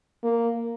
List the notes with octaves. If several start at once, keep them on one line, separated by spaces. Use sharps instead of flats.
A#3